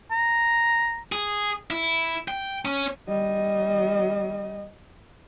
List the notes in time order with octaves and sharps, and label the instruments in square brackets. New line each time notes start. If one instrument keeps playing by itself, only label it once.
[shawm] A#5
[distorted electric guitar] G#4
E4
G5
C#4
[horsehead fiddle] G3 D#5